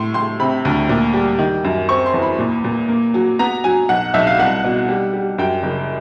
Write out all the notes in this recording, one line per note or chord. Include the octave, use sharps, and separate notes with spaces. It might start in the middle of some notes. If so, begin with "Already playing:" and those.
Already playing: A2 C6
A2 C6
C3 B5
D2
A#2
G3
D#3
F#2
C4 C#6
C6
E2
B5
A#2
A#2
A#3
F#3
B3 A#5
F#3 G#5
B1 F#5
B1 E5
F5
C2 F#5
B2
G3
G3
F#2 G5
F#1